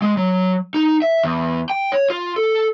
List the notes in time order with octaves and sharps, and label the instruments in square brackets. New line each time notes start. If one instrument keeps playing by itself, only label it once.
[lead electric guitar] G#3
F#3
D#4
E5
E2
G5
C#5
F4
A4